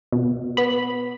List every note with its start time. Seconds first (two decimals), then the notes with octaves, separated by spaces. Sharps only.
0.12 B2
0.57 B3 B5